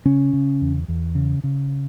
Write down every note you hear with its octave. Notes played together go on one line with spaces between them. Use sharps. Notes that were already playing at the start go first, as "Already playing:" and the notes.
C#3 C#4
C#3
E2
E2
C#3
C#3